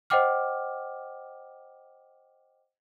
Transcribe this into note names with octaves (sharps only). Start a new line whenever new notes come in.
C5 D#5 F#5 G5 D6 F6